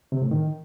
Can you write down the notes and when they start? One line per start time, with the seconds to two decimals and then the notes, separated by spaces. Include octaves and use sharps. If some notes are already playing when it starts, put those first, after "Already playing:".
0.12 C3
0.22 A2
0.31 D#3